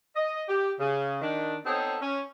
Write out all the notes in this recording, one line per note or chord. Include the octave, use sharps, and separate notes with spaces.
D#5
G4
C#3
D#3 D4
B3 C4 D#4 A4 C5 C#5
C#4